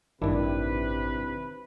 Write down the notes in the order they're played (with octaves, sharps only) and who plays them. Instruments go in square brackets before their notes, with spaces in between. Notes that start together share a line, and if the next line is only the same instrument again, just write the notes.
[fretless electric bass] A1 G2 [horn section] C3 B4 [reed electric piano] D#3 D4 E4